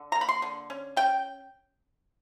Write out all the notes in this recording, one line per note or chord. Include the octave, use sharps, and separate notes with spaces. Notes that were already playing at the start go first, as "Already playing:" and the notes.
Already playing: D3
A#5
A#3
B5
C6
D3
C#4
C#4 G5